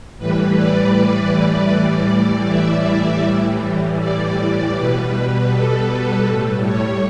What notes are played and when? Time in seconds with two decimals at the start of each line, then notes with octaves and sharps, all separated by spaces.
0.18 A2 E3 G3 B4
0.56 D5
1.70 A2 E3 G3 D5
2.46 E5
3.22 A2 E3 G3
3.98 D5
4.74 B2 G3 B4
5.51 A4
6.25 A2 G3
6.65 C#5